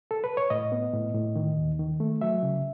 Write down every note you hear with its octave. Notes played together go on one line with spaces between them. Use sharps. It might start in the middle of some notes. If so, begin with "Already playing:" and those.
A4
B4
C#5
A2 D#5
B3
A2
A2
D#3
D#2
D#3
A3
F#3 E5
C#3